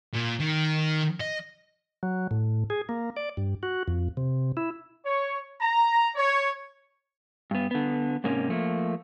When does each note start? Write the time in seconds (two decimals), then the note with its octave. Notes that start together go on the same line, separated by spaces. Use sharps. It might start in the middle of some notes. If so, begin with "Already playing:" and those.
0.14 A#2
0.40 D#3
1.20 D#5
2.03 F#3
2.31 A2
2.70 G#4
2.89 A#3
3.17 D5
3.37 G2
3.63 F#4
3.88 F2
4.17 C3
4.57 E4
5.05 C#5
5.61 A#5
6.15 C#5
7.51 G2 B3
7.71 D3 B3
8.24 G#2 C3 A#3 C#4
8.49 F3 A3 A#3